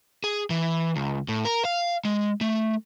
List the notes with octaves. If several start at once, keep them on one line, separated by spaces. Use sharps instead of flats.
G#4
E3
C#2
A2
A#4
F5
G#3
A3